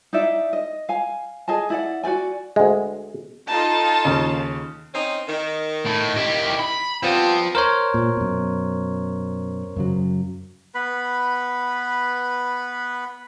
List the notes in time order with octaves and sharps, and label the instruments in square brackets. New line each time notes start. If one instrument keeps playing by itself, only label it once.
[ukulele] D#4 E4 D5 E5
D#5
F5 G#5
G#4 D#5 G#5 A5
E4 D5 F#5
F#4 B4 D5 G#5
[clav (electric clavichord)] D2 G#3
[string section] D#4 F4 A4 [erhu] A5
[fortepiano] D#2 C#3
[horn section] C4 C#4 D#4
D#3
[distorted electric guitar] A2
E4 G4
B5
[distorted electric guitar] F3 [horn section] G3 B3 C4
[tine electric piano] A#4 C5 C#5
[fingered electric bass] A#2
F#2 B2
F#2 C#3 F#3
[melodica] B3 B4 B5